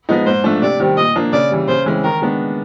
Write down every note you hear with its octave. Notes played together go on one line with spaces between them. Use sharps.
F3 G#3 B3 D#4
G#2 C5
F3 A3 D4
C3 D5
D#3 G3 C4
A#2 D#5
F3 A#3 D4
C#3 D5
E3 G3
C#3 C5
E3 G#3 C4
D#3 A#4
G#3 B3 D4